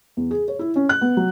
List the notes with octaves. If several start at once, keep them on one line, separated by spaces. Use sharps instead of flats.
E2
G#4
C#5
E4
C#4
F#6
B3
F#3